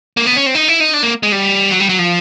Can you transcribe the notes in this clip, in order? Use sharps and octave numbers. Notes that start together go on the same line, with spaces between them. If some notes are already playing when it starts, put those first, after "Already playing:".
A#3
B3
C#4
C4
D#4
E4
D#4
D4
A#3
G#3
G3
F#3
G3
F#3
F3